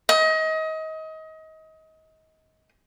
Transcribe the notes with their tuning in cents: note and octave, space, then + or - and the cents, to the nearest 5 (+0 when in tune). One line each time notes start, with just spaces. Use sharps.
D#5 +30